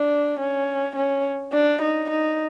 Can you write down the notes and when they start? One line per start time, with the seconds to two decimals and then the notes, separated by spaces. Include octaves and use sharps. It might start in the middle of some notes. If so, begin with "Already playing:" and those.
Already playing: D4
0.39 C#4
0.95 C#4
1.52 D4
1.82 D#4
2.10 D#4